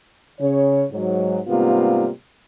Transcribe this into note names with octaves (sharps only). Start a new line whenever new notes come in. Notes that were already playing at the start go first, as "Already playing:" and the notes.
C#3 C#5
G#2 F#3
G#2 C3 G3 A#3 B3 F4